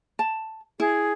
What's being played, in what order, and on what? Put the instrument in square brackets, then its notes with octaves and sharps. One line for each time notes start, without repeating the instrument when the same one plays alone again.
[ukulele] A5
[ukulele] E4 [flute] G#4